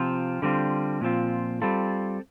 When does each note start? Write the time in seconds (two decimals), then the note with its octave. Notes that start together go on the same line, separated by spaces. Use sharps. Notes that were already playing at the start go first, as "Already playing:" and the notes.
Already playing: C3 F3 C4 F4
0.42 D3 G3 C4 F4
1.01 A#2 F3 C4 F4
1.62 G3 C4 F4 A4